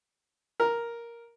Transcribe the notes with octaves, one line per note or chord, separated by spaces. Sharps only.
A#4